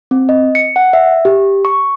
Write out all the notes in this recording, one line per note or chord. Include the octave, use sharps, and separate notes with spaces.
C4
D#5
C#7
F#5
E5
G4
C#6